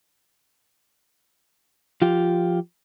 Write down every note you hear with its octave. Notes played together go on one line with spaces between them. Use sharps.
F3 F4 G4